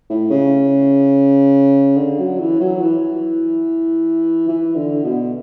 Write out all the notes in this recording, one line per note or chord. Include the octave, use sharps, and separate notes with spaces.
A2
C#3
D3
F#3
E3
F#3
E3
E3
D3
B2